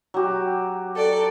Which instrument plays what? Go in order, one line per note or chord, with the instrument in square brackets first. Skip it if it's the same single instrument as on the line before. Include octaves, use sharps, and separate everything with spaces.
[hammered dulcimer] F#3 G4
[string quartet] A4 D5